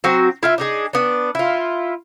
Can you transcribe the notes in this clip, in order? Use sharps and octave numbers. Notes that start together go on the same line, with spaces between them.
F#3 C4 F#4
E4 F4 E5
D4 D#4 G#4
B3 D4
E4 F4